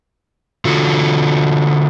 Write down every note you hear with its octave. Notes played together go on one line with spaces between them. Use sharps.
D3 F4 F#4 A4